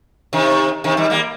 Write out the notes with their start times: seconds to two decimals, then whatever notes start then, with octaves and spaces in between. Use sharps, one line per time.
0.33 C3 D#3
0.84 C3 D#3
0.97 D#3 G3
1.10 G3 A#3